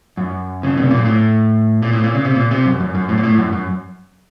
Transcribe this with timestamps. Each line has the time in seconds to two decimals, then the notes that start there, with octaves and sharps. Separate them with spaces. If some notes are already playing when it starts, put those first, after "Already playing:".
0.17 F#2
0.63 C#3
0.77 C3
0.91 A#2
1.05 A2
1.82 A#2
1.93 A2
2.04 A#2
2.15 C#3
2.25 C3
2.35 A#2
2.51 C3
2.66 F#2
2.80 F#2
2.95 F#2
3.08 A2
3.18 A#2
3.23 A2
3.38 F#2
3.53 F#2